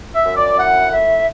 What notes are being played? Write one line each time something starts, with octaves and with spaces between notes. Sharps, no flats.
E5
F#2
D5
E4 F#5
A3 E5